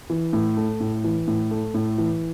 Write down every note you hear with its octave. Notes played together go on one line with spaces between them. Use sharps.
E3
A2
A3
A2
E3
A2
A3
A2
E3